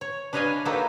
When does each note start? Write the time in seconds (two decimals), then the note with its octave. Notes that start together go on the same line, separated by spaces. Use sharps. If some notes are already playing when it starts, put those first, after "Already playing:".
0.01 C#5
0.33 D4 B4 C#5 D#5 F5 G#5
0.65 A#3 D#4 F#4 G4 A4 B4